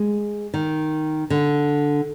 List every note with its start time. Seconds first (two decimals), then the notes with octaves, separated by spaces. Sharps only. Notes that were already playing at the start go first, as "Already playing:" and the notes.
Already playing: G#3
0.54 D#3
1.30 D3